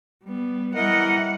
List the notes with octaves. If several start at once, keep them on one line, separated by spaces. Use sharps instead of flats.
G3 B3
E3 G3 A#4 D#5 F#5